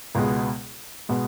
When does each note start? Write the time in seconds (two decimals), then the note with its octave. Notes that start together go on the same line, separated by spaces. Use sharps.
0.15 C#2 B2 G#3 B3
1.09 B2 G#3 B3